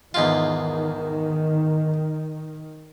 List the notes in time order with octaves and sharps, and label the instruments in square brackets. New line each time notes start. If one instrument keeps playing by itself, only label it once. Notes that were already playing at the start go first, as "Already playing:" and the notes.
[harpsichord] E2 G#2 F4 [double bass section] D#3